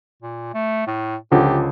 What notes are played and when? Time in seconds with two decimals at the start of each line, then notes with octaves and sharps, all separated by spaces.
0.22 A#2
0.54 A3
0.87 A2
1.31 C#2 D3 F3 G4